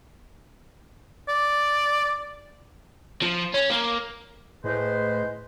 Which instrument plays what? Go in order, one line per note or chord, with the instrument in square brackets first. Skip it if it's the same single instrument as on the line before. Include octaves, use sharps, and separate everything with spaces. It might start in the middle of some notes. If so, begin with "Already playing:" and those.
[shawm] D5
[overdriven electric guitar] F3
C#4
A#3
[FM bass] A2 [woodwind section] G#3 B4 C5